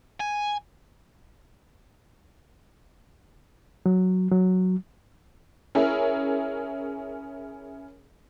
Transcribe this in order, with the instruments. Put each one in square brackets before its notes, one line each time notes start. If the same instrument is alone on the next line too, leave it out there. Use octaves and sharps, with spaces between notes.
[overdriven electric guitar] G#5
[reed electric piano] F#3
F#3
[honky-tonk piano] C#4 E4 G#4 A#4